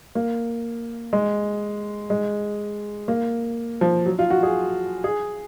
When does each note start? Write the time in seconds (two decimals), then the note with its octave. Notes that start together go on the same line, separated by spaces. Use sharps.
0.15 A#3
1.13 G#3
2.10 G#3
3.08 A#3
3.81 F3
4.06 F#3
4.19 F4
4.30 F#4
4.43 G#4
5.04 G#4